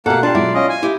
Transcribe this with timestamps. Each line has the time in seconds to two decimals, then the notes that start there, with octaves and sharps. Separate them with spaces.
0.06 B2 A3 A#3 G4 A4 F#5
0.23 D4 F4 G4 G5 A5
0.35 B2 F#3 G#3 E4 D5
0.54 C#4 D#5 F5
0.69 G#5
0.83 E4 G4 E5